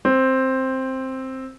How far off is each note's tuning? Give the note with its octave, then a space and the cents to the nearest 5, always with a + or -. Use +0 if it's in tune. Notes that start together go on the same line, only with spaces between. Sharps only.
C4 +5